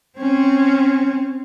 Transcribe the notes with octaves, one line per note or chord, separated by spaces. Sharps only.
C4 C#4